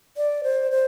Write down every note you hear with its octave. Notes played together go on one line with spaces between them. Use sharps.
D5
C5
C5